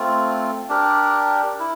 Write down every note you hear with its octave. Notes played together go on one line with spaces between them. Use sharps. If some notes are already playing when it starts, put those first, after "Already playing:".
Already playing: A3 C4 F4
D4 G4 A#4
E4